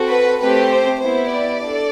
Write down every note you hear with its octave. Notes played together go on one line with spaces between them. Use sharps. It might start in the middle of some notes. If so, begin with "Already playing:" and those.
Already playing: C4 F#4 A4
B4
A3 C4 G4 B4
C5
B3 E4 G4 C5
D5
D4 A4